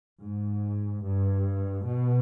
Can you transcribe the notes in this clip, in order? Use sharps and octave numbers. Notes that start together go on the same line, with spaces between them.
G#2
G2
B2